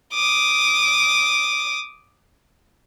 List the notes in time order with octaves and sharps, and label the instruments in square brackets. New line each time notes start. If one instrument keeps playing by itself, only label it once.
[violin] D6 D#6